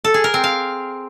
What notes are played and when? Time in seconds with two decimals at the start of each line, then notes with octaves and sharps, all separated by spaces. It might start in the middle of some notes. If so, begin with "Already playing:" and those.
0.04 A4
0.14 G#4
0.24 A#4
0.34 C4
0.44 F5